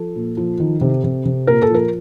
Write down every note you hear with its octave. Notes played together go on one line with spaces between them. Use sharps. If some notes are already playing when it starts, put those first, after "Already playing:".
Already playing: F3 A4
A#2
F3
D#3
C3
C3
C3
A#2 A#4
A4
F3 A#4